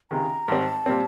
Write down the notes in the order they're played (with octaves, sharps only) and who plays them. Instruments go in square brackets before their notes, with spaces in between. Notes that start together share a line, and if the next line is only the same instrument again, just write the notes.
[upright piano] C#2 C3 D#3 G#3 [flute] A#5
[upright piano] G#2 D#3 G3 C4 [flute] A5
[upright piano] A#2 G3 C4